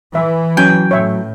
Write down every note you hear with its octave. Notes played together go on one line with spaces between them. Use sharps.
E3 E5
F#3 C#4 G5 G#5
A2 C#5 E5